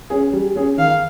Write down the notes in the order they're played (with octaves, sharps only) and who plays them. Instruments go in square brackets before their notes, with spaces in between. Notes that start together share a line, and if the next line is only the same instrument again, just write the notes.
[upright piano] C#4 G#4
G3
C#4 G#4
[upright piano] D#3 [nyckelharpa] F5